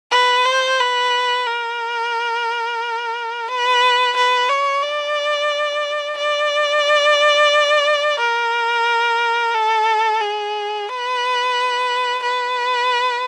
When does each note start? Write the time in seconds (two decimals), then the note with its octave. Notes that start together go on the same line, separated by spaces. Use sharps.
0.12 B4
0.46 C5
0.80 B4
1.47 A#4
3.48 B4
4.16 B4
4.49 C#5
4.83 D5
6.18 D5
8.19 A#4
9.55 A4
10.21 G#4
10.89 B4
12.23 B4